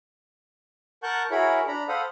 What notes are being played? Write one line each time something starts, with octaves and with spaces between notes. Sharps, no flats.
A#4 F#5 A5 C#6 F#6 G6
E4 F#4 G#4 A#4 C#5 B5
D4 A#5 B5
A4 C5 F5 F#5 B5 D#6